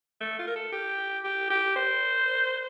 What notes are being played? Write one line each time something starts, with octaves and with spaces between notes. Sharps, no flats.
A3
F4
A#4
A4
G4
G4
G4
C5